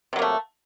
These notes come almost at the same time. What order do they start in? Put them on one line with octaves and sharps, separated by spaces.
C3 F#3 A#3 A3